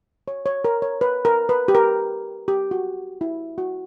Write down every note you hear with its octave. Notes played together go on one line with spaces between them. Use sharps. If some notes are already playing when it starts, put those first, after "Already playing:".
C#5
C#5
A#4
C#5
B4
A#4
B4
G4
A#4
G4
F#4
E4
F#4